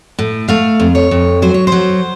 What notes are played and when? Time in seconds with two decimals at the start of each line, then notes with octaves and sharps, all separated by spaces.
0.19 A2
0.48 A3 F5
0.80 F2
0.95 C#5
1.11 F2
1.42 F#3 C5
1.54 C#5
1.67 F#3 C5